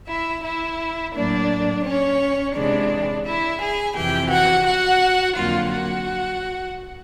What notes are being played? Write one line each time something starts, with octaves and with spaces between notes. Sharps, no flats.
E4 E5
E4 E5
A2 F#3 A#3 D4 D5
C#4 C#5
C3 E3 G#3 D4 D5
E4 E5
G#4 G#5
F2 C3 E3 G4 G5
F#4 F#5
F#4 F#5
F2 D3 F#3 A#3 F4 F5
F#4 F#5